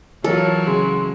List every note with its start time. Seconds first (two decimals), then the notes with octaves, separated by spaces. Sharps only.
0.24 E3 F#3 F4 A4 A#4 C#5
0.67 C#3 G#3 C6